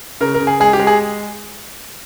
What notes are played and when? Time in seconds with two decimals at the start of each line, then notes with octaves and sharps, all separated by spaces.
0.20 C#3 A#4
0.34 A#4
0.40 C#3
0.47 G#4
0.60 G#3 G#4
0.73 G4
0.80 G#3
0.87 G#4